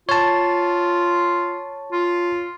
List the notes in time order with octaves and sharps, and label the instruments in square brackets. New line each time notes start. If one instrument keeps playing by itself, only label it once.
[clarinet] F4 [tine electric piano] C#5 A5
[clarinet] F4